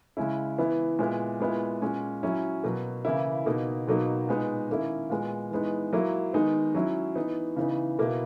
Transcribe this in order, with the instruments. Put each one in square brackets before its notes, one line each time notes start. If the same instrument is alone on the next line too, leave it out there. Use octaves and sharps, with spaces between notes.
[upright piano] C#3 G#3 C#4 E4
E3 B3 E4
A#2 G#3 B3 E4
A#2 G#3 B3 E4
A#2 G#3 C#4
F#3 C#4 E4
B2 F#3 A#3
C#3 E3 A#3 E4
B2 A#3 D#4
B2 F#3 A#3 D#4
A#2 G#3 B3 D#4
D#3 A#3 C#4 E4
A#2 G#3 B3
E3 G#3 B3 D#4
F#3 A#3 E4
D#3 G#3 B3 D#4
F#3 C#4 E4
E3 B3 D#4
C#3 E3 B3 D#4
B2 A#3 E4